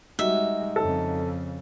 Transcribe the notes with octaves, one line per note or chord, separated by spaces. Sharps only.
G3 G#3 D#4 F#4 E5
F2 C#3 A4